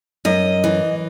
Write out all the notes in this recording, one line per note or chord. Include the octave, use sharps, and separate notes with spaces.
F#2 D#5
E3